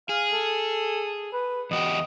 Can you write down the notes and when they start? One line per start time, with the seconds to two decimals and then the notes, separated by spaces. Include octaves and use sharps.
0.09 G#4 F5
0.32 A4
1.33 B4
1.71 E2 F#4 G4 D#5